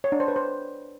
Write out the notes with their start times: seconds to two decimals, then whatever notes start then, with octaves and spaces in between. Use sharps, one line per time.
0.04 C#5
0.12 D4
0.20 C5
0.28 B4
0.36 C5